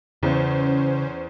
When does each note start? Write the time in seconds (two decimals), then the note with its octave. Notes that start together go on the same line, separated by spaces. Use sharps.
0.23 E2 C#3 C#4 C5